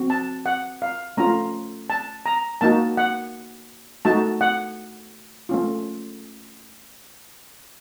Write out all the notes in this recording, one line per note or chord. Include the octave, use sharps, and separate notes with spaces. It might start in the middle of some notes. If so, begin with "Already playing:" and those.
Already playing: C4 F#4
A5
F#5
F5
A3 C#4 F4 A#5
A5
A#5
A#3 D#4 F#4 A5
F#5
A3 D#4 F#4 A5
F#5
A3 C#4 F4